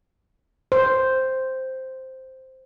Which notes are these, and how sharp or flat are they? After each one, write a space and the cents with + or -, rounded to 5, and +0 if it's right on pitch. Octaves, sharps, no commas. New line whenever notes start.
C5 +0